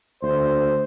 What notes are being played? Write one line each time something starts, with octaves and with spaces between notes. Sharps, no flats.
D2 C5